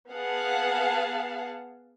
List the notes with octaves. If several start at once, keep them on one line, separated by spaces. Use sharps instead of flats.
B3 G#4 F5 F#5 A5